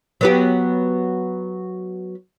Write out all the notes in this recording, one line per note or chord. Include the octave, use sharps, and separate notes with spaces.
F#3 B3 G4